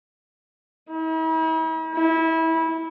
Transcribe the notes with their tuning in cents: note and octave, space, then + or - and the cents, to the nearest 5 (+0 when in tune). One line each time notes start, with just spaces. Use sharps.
E4 -45
E4 -25